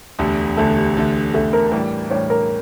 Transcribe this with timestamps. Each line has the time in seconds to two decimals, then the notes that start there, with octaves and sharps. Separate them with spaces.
0.19 E1 D2 D3 A3 G4
0.57 E1 D2 D3 A3 A4
0.77 G4
0.96 E1 D2 D3 A3
1.34 E1 D2 D3 A3 A4
1.53 A#4
1.72 A2 E3 G3 D4 A#4
2.10 A2 E3 G3 D4 C#5
2.30 A#4